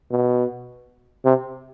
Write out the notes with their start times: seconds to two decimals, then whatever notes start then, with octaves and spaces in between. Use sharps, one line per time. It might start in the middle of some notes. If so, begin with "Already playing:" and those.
0.11 B2
1.25 C3